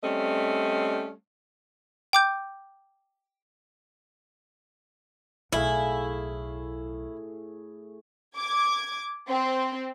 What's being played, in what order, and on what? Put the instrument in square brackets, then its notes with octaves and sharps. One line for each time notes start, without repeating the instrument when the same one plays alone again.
[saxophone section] G3 A3 C4 C#4 D5 D#5
[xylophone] G5 D6 G6
[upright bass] B1 [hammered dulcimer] A2 G#4 F5 [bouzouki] E4
[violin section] D6 G#6
C4